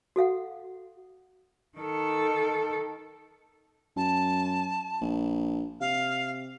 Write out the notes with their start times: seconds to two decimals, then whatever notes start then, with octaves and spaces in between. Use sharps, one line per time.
0.16 F#4 A4 F5 F#5
1.78 D#3 A4
3.97 F#2 A5
5.01 A#1
5.80 C3 F5